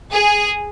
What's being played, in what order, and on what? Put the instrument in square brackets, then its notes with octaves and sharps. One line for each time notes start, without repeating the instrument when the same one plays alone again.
[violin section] G#4